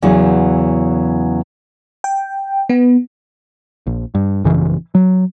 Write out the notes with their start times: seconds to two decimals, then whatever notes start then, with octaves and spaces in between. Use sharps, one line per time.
0.02 E2 C#3 E3 F#3
2.04 G5
2.69 B3
3.87 A#1
4.15 G2
4.44 A#1 F#2 C#3 E3
4.95 F#3